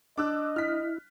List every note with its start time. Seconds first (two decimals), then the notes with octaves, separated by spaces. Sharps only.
0.17 D4 D#5 D6 E6 F#6
0.56 E4 F6 B6